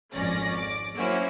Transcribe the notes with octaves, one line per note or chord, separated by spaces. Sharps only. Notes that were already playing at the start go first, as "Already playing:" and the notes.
G#1 F2 C#4 D5 A#6
D6
F#3 A#3 C#4 E4 F#4 C5